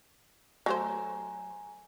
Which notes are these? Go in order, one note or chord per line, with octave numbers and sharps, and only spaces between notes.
F#3 A3 C5 G#5 A#5